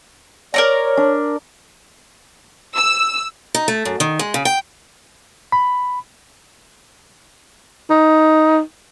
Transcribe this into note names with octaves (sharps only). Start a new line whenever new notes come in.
A#4 C#5 D5 A#5
D4
E6
D#4
A3
F#2
D#3
G#3
C#3
G5
B5
D#4